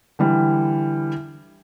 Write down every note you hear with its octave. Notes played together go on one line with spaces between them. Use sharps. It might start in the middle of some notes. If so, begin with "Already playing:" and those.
D3 E3 G3